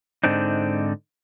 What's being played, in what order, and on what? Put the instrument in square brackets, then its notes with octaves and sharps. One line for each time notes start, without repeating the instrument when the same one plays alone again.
[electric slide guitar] G#2 D3 C4 D4 D#4